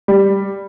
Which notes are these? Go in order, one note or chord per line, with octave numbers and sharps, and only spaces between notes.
G3